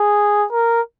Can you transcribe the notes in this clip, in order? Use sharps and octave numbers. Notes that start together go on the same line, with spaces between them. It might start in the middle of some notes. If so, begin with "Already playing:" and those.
Already playing: G#4
A#4